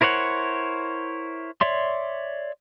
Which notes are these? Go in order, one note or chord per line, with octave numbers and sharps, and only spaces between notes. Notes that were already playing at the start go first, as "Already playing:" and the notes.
E4 A#4 C5 C#5 F#5
C#5 D5 E5 C6